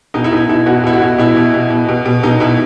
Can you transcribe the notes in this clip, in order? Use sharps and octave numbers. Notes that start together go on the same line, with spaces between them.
B2 D#4
E4
B2 D#4
B2 E4
B2 F#4
B2 E4
F#4
B2
B2 E4
B2
B2
B2
B2
B2
B2 D#4
B2 E4